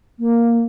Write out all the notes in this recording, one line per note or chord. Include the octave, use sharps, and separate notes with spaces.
A#3